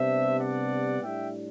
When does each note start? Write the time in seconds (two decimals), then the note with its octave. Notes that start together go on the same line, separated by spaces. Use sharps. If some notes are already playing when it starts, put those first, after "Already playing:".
Already playing: C3 G3 B3 D4 C5 E5
0.39 D5 F#5
1.02 A2 G3 D4 E5 G5